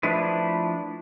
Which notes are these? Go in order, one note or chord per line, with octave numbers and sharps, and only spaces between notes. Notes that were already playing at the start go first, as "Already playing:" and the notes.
F3 A3 D4 E4 B4